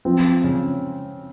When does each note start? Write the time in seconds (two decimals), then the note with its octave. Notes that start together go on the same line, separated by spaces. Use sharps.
0.05 F3 C4
0.44 C#3